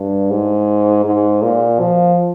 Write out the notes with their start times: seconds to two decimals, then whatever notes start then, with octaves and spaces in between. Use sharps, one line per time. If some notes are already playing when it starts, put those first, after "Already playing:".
Already playing: G2
0.30 G#2
1.05 G#2
1.42 A#2
1.79 F3